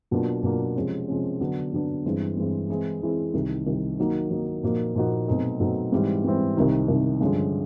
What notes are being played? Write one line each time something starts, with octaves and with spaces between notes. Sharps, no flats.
B2 F#3 A#3 D4 F4
B2 F#3 A#3 D4 F4
C3 F3 G#3 C#4
C3 F3 G#3 C#4
D3 F#3 B3 D4
D3 F#3 B3 D4
G2 E3 G#3 C4
G2 E3 G#3 C4
E3 G#3 C4 E4 G#4
E3 G#3 C4 E4 G#4
C2 C3 D#3
C2 C3 D#3
D#3 F#3 A#3 D#4
D#3 F#3 A#3 D#4
A#2 F3 A#3 D#4 F#4
A#2 F3 A#3 D#4 F#4
B2 F#3 A3 C4 D#4
B2 F#3 A3 C4 D#4
G#2 E3 G3 C4
G#2 E3 G3 C4
C2 C3 D#3
C2 C3 D#3
G2 D3 F3 G#3 C#4